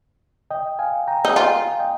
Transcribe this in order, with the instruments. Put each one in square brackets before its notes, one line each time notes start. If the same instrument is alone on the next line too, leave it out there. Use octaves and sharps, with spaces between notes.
[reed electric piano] D#5 G5
F5 G#5
G5 A#5
[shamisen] D#4
[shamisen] F4 [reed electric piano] F5 G#5
[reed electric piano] D#5 G5